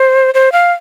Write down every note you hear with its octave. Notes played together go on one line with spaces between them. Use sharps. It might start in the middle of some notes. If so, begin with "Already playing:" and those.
Already playing: C5
C5
F5